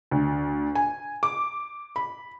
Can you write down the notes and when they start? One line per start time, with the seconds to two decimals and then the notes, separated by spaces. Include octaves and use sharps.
0.11 D2
0.75 G#5
1.23 D6
1.96 B5